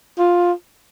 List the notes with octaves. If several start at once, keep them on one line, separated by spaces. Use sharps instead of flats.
F4